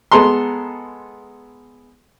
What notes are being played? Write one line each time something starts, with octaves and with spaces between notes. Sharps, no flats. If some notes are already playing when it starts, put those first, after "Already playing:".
G#3 B3 A4 A#5 C6